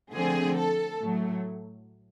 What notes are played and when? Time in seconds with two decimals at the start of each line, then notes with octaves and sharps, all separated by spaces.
0.13 D3 F3 A3 C4 G#4
0.57 A4
1.01 A2 F#3 A3